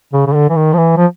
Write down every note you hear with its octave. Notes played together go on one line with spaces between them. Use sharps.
C#3
C#3
D3
E3
D#3
F3
E3
F3